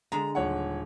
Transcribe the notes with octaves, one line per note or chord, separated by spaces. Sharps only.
D3 G#3 A#5
D#1 C#5 F#5